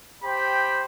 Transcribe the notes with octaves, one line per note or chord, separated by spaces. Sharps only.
G4 C5 G5 B5